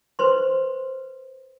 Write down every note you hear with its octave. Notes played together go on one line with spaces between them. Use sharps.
B4 C5 C6